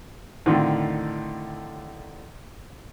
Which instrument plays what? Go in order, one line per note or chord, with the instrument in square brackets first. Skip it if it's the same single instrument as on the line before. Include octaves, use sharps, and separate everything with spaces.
[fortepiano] A2 D3 D#3 A3 C4 F4